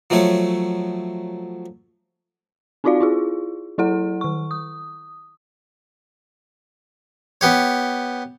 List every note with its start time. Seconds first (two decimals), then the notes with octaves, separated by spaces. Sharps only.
0.10 F3 F#3 A3 C#5
2.84 C4 D#4 F4 F#4 D5 F5
3.00 E4 F4 G#4
3.78 F#3 E4 A4 F#5
4.21 D#3 C#6
4.51 D#6
7.41 B3 G4 C#5